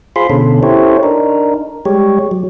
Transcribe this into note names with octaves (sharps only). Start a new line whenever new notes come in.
F4 G#4 C5 B5 C6
B2 D3 C#4 A4
C#4 E4 G4 A4 C5 C#5
D4 D#4 A#4
G3 G#3 G4 C#5
F#3